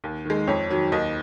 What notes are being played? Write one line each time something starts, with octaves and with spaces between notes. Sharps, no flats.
D#2
D#3 G#3
F2 C#5
D#3 F#3
D#2 D#5